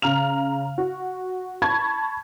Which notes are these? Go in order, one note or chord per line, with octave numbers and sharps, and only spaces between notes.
C#3 A#5 F6 F7
F#4
A5 B5 C#6 G#6